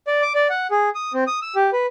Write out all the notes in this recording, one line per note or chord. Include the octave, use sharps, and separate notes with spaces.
D5
D6
D5
F#5
G#4
D#6
C4
D#6
E6
G4
B4